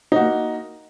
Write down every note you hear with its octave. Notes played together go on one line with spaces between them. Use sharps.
A#3 D#4 F#4